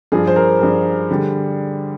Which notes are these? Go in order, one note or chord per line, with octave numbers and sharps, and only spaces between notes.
G2 F3 G#4
C5
A#4
G2 F3 G#4
D3 G3